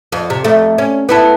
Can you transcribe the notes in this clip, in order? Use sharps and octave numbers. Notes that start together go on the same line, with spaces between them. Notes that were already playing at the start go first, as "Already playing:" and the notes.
F2
C3
F2 A3
C#4
B3 E4 A4